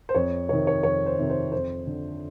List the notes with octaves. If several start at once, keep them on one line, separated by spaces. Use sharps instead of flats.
C5
F2 C#5
C3 D#3 C#5
C#5
F2 C#5
C5
C3 D#3
C5
F2 C5
D3